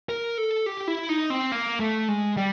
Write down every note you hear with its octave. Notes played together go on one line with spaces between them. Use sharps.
A#4
A4
G4
E4
D#4
C4
A#3
A3
G#3
G3